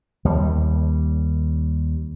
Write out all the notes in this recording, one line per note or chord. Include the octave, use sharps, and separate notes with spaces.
D#2 G3